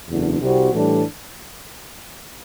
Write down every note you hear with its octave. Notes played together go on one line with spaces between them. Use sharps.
F#1 E2 D3
C2 C3 G3 C4 F#4
A2 E3 G3 D4 A4